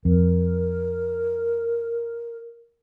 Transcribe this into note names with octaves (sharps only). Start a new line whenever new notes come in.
F2 A#4